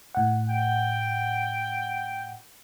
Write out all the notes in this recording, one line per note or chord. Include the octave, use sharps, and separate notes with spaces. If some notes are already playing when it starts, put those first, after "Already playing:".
A2 F#5
G5